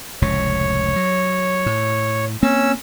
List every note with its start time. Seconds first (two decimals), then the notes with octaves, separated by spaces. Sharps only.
0.22 F1 C#2 A2 C#5
0.96 F#3
1.66 A2
2.43 A#3 C4 C#4 E6